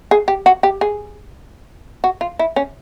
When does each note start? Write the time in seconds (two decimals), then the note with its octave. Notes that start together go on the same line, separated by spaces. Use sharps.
0.11 G#4
0.28 G4
0.46 F#4
0.63 G4
0.81 G#4
2.04 F#4
2.21 F4
2.39 E4
2.56 C#4